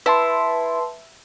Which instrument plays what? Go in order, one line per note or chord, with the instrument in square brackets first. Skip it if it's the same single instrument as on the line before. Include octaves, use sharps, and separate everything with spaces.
[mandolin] E4 [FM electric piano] B4 A5 C6